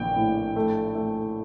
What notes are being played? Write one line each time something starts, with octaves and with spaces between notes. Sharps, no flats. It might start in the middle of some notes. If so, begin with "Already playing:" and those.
Already playing: A#1 G5
A2
A3
A3